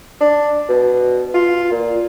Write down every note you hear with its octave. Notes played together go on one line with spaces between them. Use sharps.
D4
B2
F4
A#2